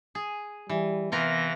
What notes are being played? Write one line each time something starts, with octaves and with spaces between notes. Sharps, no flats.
G#4
E3 G3
C3 E3 B3 F4 A#4 A#6